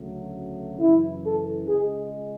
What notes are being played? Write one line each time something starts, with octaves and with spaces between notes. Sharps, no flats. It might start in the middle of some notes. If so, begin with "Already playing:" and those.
Already playing: D2 C#3 F#3 A3
F#2 C#3 E3 E4
A4
C#2 C#3 G#3 G#4